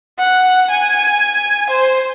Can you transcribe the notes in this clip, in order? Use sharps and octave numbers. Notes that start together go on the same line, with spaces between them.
F#5
G#5
C5